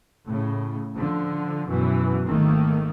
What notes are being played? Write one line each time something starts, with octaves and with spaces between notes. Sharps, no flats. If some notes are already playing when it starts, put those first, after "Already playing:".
A2 C#3
D3 F3
F#2 B2 E3
G#1 D#3 A3 A#3